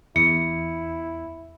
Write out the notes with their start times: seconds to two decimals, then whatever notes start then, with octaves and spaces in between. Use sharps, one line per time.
0.16 E2 E4 C#7